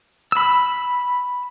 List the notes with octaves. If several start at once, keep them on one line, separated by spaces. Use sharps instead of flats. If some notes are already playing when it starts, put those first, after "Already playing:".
B5 E6